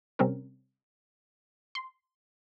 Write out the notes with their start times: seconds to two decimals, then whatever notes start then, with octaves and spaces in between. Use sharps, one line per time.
0.19 C3 G3 C4 C#4 A#4
1.75 C6